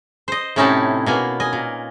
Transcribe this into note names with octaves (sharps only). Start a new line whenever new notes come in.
C5 D#5
A2 C3 C#4 D#4 E4 A5
B2 A#3 G#5
D#5 G#5
A#2